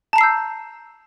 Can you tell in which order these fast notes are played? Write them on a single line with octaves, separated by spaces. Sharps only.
A5 A#5 C7 E6 G6